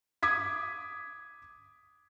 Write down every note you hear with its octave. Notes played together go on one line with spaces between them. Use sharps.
D6 D#6 G#6 B6